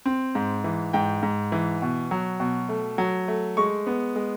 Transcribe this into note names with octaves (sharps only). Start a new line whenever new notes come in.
C4
G#2
E3
G#2 G5
G#2
E3
B2
F#3
B2
A3
F#3
A3
G#3 C#6
B3
G#3